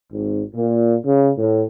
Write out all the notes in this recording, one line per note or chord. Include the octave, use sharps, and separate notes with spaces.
G#1
A#2
C#3
A2